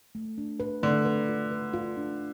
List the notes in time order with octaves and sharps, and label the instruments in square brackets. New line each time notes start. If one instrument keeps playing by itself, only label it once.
[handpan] A3
D4
B4
[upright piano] D3 [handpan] A3
[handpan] B4
F4
B4
F4
D4